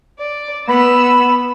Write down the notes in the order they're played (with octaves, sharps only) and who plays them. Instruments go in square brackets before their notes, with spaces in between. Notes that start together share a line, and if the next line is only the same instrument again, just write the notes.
[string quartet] D5
[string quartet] B3 E6 [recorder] B5